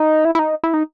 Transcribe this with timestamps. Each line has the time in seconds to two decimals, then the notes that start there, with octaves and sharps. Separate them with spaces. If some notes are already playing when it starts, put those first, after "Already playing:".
Already playing: D#4
0.25 E4
0.35 E4
0.39 D#4
0.63 E4
0.74 D#4